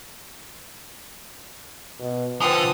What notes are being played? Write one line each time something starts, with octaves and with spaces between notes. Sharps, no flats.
B2
D3 F3 B4 G5 G#5 D#6